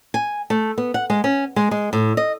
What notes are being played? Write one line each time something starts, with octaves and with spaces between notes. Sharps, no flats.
G#5
A3
B3
F#5
G#3
C#4
G#3
G#3
A2
D#5